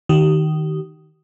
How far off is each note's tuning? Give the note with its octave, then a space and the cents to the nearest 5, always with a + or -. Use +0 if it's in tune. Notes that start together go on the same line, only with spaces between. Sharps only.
D#3 +0 G4 -35